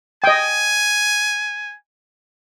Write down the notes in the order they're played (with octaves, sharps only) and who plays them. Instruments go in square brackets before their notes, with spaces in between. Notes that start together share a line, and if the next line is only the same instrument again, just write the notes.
[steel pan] D#5 G5 [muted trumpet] G#5